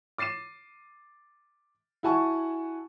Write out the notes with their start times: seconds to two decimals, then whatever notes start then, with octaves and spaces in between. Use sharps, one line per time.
0.18 D6 A6 C7 D#7 E7
2.03 E4 F#4 F#5 G#5 A5 C#6